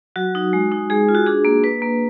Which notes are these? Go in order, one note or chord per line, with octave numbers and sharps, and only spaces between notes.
F#3 F#4
D#4
G#3
D#4
G#3 G#4
F4
F#4
D4 G#4
A#3
A#3 B4
A#3